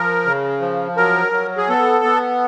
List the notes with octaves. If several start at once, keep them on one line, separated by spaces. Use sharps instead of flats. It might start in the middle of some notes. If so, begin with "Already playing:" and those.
Already playing: F3 A#4
C#3
F3
F#3 A#4
F#3
G#4
B3 A4
B3